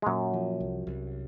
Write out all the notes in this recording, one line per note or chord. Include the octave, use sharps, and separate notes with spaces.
G#3
F#2 A#2 F#3
F3
C2
C2